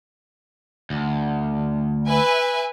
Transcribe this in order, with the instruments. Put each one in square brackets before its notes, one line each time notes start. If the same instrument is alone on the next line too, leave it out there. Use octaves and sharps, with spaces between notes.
[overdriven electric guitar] D2
[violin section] B4 E5 G#5